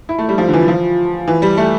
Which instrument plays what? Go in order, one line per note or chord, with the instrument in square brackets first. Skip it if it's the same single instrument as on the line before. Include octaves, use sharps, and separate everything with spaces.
[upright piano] E4
A3
G3
F3
D3
E3
F3
E3
G3
A3